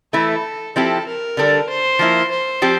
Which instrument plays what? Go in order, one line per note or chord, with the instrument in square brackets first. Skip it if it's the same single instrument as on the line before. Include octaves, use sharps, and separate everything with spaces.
[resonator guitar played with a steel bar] E3 A3 E4 [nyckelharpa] A4
[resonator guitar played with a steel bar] F3 C4 E4 G4 [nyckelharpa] A4
[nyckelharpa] A#4
[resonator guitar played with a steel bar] D3 G3 D4 A4
[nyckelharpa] C5
[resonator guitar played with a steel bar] F3 A#3 E4
[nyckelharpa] C5
[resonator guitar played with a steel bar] F3 C4 G4